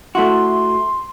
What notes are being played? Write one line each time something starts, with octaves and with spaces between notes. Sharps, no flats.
A3 E4 F#4 C6